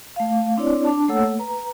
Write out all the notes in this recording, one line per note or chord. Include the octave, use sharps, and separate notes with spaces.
A3 F5
C4 D4 E4 C#5 D5
D4 A5
A3 A#3 A4 C#5 F#5 E6
B4 A#5